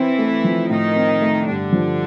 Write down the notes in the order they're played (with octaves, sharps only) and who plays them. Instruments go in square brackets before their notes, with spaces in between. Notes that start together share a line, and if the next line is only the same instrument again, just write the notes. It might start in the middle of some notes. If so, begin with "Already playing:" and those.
Already playing: [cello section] E3 E4 [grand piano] C4
[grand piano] A3
F3
[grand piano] A2 [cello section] D#3 D#4
[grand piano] C4
A3
[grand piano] G2 [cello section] D3 D4
[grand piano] F3